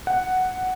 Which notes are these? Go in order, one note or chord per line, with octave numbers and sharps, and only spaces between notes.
F#5